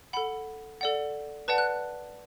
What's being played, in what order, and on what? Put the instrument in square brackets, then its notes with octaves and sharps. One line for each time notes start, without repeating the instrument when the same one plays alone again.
[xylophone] A4 F#5 B5
A4 D5 F#5
B4 D5 F#5 A5
F#6